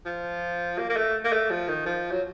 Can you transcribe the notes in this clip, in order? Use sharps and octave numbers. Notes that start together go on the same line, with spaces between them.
F3
A#3
A#3
A3
A#3
A3
F3
D#3
F3
F#3